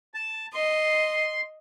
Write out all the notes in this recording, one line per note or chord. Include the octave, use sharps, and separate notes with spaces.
A5
D#5 C6